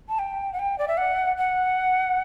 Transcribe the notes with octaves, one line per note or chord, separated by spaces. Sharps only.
A5
G5
F#5
G5
D5
E5
F#5
F#5